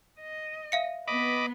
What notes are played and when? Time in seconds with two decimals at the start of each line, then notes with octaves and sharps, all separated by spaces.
0.20 D#5
0.72 E5 F5 C#7
1.08 B3 B4 D#5 B5 D6